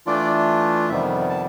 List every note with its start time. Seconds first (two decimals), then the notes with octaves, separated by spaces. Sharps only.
0.07 E3 A3 D4 F4 D5
0.89 F2 C3 D#3 G3 B3 E5
1.30 A5